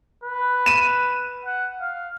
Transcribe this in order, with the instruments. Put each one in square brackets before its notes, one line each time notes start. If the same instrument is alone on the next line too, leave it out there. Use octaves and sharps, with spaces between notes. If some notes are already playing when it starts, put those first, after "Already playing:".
[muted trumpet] B4
[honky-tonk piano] D#7 E7
[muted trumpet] F#5
F5